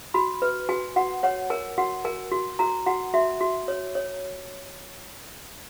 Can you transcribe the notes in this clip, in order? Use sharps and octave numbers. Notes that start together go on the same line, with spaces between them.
F#4 B5
B4
F#4 G#5
F#4 F#5
C#5 F#5
A#4 G#5
F#4 F#5
A#4 G#5
F#4
F#4 A#5
F#4 F#5
F#4 E5
F#4
C#5
C#5